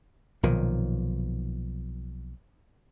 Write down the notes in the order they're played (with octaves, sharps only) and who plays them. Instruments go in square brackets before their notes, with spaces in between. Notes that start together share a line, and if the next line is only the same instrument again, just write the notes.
[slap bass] B1 A#2 D#3 F3